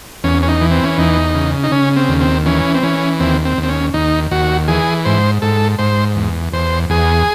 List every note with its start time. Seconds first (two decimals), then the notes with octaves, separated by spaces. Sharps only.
0.24 E2 C#4
0.42 C#4
0.49 D#4
0.62 E3
0.71 C4
0.84 C#4
0.98 E2 D#4
1.35 C#3
1.64 D#4
1.72 C#3 C#4
1.97 C4
2.09 D#2
2.21 C4
2.46 E3 C#4
2.74 C4
2.83 E3 C#4
3.20 D#2 C4
3.45 C4
3.57 D#2
3.63 C4
3.69 C#4
3.94 D#2 D#4
4.31 D#2 F#4
4.68 E3 G#4
5.05 G#2 C5
5.42 G#2 A4
5.79 G#2 C5
6.16 E2
6.53 E2 C5
6.90 E2 G#4